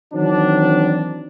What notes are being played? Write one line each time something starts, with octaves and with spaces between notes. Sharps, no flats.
D#3 E3 F#3 C4 D4